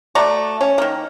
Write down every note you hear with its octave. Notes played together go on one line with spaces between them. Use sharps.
A3 F#4 D5 A#5
C#4
D#3 A#3